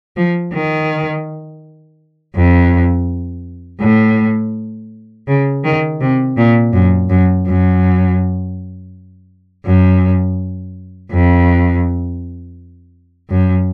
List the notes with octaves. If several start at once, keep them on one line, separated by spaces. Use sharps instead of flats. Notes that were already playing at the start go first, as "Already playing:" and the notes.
F3
D#3
F2
A2
C#3
D#3
C3
A#2
F#2
F#2
F#2
F#2
F2
F#2